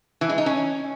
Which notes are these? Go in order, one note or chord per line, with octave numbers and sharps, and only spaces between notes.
E3
G#3
D#4
C#4